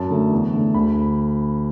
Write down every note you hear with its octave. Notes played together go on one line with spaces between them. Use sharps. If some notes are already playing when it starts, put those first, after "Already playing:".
Already playing: F#2 A5
D3 A3
E2
D3 A3
D2 B5